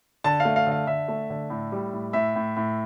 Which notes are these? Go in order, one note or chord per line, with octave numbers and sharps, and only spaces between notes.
D3 A5
F5
A3
F5
D3 F5
D3 E5
A3
D3
A2
G3
A2
A2 E5
A2
A2